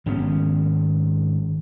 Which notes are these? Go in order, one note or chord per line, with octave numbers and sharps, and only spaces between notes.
G#1 D#3 B3 C#4